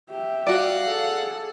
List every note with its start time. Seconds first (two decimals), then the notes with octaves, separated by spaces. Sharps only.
0.10 G4 E5
0.47 F#4 D5 F5 F#5
0.83 G#4 A4